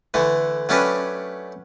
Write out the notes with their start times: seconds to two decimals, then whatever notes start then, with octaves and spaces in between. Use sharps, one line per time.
0.14 D3 E3 A3
0.69 F#3 A3 C#4 D4 G4 B4